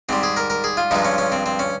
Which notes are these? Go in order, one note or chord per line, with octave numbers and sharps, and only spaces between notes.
G#2 G3 C4
G#4
A#4
A#4
G#4
F4
G2 F3 G#3 D#4
C#4
C#4
C4
C4
C#4